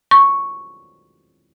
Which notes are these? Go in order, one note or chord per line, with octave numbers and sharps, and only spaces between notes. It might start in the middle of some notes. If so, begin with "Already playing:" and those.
C#6